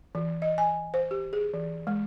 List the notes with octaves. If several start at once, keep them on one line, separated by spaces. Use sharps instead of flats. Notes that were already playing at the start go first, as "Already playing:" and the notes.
E3
D#5
G#5
C5
G4
G#4
E3
G#3